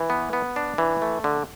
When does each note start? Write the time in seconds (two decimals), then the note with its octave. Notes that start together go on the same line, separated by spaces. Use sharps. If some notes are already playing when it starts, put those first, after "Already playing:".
Already playing: E3
0.10 B3
0.33 B3
0.56 D4
0.78 E3
1.02 A3
1.24 D3